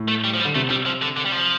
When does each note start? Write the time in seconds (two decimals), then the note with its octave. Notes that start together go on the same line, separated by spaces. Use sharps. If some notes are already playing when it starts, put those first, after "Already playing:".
Already playing: A2
0.08 A3
0.24 G3
0.34 F3
0.40 G3
0.45 D3
0.55 C3 A3
0.70 C3 G3
0.86 F3
1.02 D3
1.17 D3
1.25 G3
1.32 F3